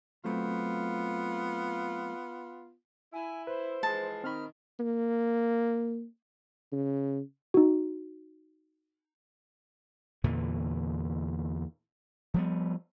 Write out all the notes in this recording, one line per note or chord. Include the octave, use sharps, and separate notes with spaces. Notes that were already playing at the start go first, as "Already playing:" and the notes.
F#3 A3 B3 C4 F4
E4 G#5
B4 C5
E3 F3 G#3 A5
D#3 C4 B5 F6
A#3
C#3
D#4 F#4
E2 A#2 D3 E3
F3 G3 B3